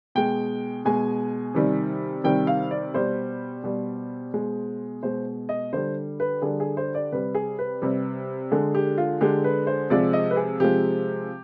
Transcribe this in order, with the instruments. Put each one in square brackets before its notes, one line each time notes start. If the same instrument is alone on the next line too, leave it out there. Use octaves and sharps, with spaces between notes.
[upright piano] B2 G#3 G5
B2 G#3 G#5
C3 D#3 G3
C3 D#3 G3 G5
F5
D5
B2 G3 C5
B2 G3
B2 G#3
B2 G#3 C5
D#5
D3 G3 C5
B4
D3 G3 G#4
G#4
C5
D5
C3 G3 B4
G#4
B4
C3 G3
D3 G#3 G#4
G4
F4
D3 G#3 G4
B4
C5
C3 F3 G#3 D5
D#5
B4
G#4
C3 F3 G#3 G4